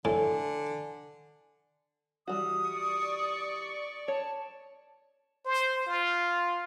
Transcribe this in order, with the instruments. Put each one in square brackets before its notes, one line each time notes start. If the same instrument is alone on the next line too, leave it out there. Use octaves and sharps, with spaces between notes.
[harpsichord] A2 [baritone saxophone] D3 [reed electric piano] G#5
[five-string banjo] E3 G3 F#4 [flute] D#6
[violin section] D5 C#6
[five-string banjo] C#5 [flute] A5
[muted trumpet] C5
F4